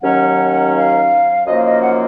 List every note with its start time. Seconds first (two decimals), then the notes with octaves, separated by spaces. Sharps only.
0.02 D#2 D#3 F#3 C#4 F#5
0.75 F5
1.46 F#2 F3 A#3 D#4 D#5
1.56 F5
1.66 D#5
1.82 F#5